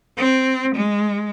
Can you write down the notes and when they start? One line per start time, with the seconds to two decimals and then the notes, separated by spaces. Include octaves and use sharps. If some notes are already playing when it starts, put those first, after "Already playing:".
0.18 C4
0.74 G#3